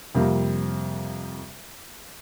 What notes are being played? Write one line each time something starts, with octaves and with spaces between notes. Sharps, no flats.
F2 C3 G3 A#3